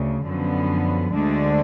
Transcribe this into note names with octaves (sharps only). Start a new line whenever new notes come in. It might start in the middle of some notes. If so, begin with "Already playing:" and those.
Already playing: D2 C#3
F#2 D3 F3 B3
D2 D3 G#3 D4